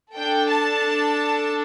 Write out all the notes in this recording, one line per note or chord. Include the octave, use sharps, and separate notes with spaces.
D4 A4 G5
A5